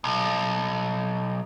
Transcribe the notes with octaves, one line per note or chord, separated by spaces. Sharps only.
B1